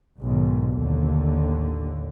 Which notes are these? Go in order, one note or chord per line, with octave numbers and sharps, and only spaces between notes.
B1 G#2 D#3
A1 D#2 D3